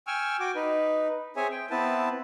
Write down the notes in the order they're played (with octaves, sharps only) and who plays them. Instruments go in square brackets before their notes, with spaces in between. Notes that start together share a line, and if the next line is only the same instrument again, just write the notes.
[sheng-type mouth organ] G5 G#5 C#6 E6 F6
F#4 G5 D6
D#4 B4
C4 G#4 C#5 E5 G#5
G5
B3 C4 E4 B4 A5